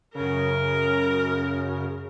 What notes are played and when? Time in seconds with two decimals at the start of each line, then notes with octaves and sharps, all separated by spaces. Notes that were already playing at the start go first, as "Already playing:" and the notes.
0.15 F#2 C#3 A#4